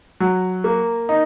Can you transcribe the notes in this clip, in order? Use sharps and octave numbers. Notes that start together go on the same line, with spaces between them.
F#3
A#3
D#4